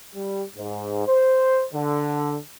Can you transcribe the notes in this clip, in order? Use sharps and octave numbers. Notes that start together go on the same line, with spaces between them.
G3
G#2
C5
D3